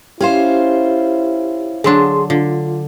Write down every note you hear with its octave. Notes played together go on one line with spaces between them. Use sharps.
C#4 E4 F4 G4 C5
D3 F#3 D4 G#4 C6
D3 F4